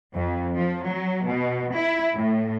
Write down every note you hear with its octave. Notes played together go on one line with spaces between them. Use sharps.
F2
F3
F#3
B2
E4
A2